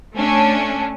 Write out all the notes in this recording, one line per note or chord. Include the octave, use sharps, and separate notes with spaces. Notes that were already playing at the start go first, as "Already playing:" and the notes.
A3 C#4 D4